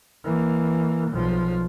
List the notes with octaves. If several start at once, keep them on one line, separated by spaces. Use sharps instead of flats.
E3 A#3
B1 F3